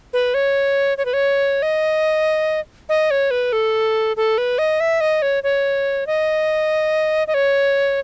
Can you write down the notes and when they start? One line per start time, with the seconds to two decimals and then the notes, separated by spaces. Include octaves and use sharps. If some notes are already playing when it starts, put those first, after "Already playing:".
0.13 B4
0.34 C#5
0.98 C#5
1.05 B4
1.13 C#5
1.62 D#5
2.89 D#5
3.11 C#5
3.31 B4
3.53 A4
4.17 A4
4.38 B4
4.58 D#5
4.80 E5
5.01 D#5
5.22 C#5
5.43 C#5
6.07 D#5
7.27 D#5
7.34 C#5